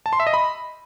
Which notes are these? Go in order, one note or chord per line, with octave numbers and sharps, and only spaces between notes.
A5
C6
E5
D#5
B5